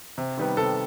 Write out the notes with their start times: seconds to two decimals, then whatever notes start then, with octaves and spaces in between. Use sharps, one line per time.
0.18 C3
0.38 D#3 G3 B3
0.57 C3 A4